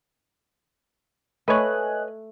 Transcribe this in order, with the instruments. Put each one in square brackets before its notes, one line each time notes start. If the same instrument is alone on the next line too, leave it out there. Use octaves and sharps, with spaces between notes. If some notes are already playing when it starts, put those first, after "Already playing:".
[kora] A3 [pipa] B4 C#5 [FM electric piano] D#5 G#5 F#6